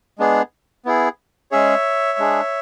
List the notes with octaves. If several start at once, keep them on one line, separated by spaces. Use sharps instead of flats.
G#3 B3 D4 G#4
B3 E4 G#4
G#3 C#4 G#4 C#5 E5
G#3 D4 G#4